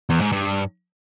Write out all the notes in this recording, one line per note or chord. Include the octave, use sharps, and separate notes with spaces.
E2
G#2
G2